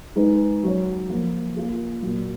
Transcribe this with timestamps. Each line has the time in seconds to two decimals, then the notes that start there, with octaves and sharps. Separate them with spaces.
0.16 G#3 D#4 G#4 B4
0.63 F#3 C#4 F#4 C#5
1.09 F3 A#3 F4
1.56 A#3 F4 G#4
2.02 A#2 F#3 A#3